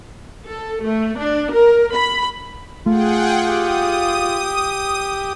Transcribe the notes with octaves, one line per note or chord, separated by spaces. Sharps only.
A4
A3
D4
A#4
B5
A3 F4 G#4 F#5 G5
G4 D#6